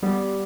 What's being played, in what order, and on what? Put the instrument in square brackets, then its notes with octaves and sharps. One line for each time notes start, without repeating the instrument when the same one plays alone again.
[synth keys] G3 B3 G4